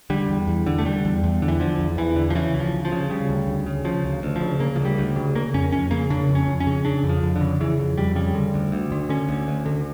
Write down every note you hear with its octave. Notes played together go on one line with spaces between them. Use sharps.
D3 G3
E2
E2
D3
A3
D3 G3
E2
E2
D3
E3
D3 F3
E2
E2 E3
D3
F3
C#3 E3
D2
F3
D2
F3
C#3
C#3 G3
D2
D2
C#3
C#3 F3
D2
D2
F3
C#3
C#3 A#3
F3
D2
G3
D2
C#3
C#3 A#3
F2 C#4
F2 C#4
C#3 A#3
C#3 D4
F2
C#4
F2
C#4
C#3
C#3 D4
F2
F3
F2
D3
C#3
C#3 E3
F2
F2 G3
C#3 G3
D3
D2
D2
D3
D3 C#4
D2
D2
D3